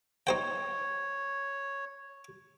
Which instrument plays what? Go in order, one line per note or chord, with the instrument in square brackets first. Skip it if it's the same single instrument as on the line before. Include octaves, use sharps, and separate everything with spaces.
[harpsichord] D#4 C5 G5 [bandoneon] C#5